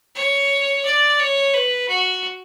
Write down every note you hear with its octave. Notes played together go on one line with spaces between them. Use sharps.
C#5
D5
C#5
B4
F#4